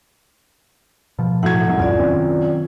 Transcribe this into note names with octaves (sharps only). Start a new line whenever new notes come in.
B2 F3
A2 F#3 F#5 G#6
C2 F#2
E2 G#2 F4 D5
D#3 C4 C#4